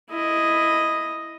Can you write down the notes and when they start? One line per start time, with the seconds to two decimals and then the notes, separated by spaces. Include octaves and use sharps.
0.11 E4 D#5